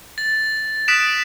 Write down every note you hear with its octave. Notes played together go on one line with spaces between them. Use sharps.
A6
D#6 F#6 B6 D7 E7